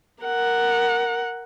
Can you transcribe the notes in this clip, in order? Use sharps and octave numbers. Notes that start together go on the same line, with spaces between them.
A#4 F#5